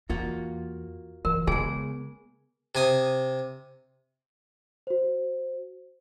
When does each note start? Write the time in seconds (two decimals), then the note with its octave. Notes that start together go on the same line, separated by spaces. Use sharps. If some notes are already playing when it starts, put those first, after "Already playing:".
0.09 E2 A#3 F4 F#4
1.25 E3 A#4
1.47 C#3 G#3 B3 G#4 G#5
2.75 C3 G#5 D#6
4.87 F#4 C5